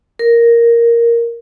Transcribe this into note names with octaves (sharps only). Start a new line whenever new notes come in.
A#4